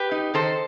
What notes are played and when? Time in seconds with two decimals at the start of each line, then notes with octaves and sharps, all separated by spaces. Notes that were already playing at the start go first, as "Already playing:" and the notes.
Already playing: G4 B4
0.11 D#4
0.34 D#3 A4 C5